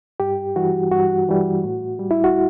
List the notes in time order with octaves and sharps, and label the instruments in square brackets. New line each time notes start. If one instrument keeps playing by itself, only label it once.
[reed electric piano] G2 G4
E3 G3 F#4
G2 F#4
E3 G3
A2
G3
E4
F#4